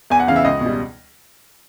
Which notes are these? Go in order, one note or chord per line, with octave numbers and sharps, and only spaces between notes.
E2 G#5
F#5
C#3 E3 F5
E5
C#2 D#5
B2
G3